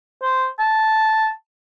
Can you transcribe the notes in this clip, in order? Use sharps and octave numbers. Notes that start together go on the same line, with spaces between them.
C5
A5